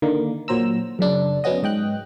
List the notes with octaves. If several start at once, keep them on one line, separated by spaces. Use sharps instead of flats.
D3 D#3 A#3
A#2 F#3 C5 A#5 E6
F#2 C#3 D4
F#3 B3 C#4 F#4 D#5
G#2 D#5 G5 F#6